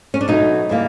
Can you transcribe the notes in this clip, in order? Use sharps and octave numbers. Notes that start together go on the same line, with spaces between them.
C#4
D4
B2 F#3 A3 D#4
C#3 E3 G3 A#3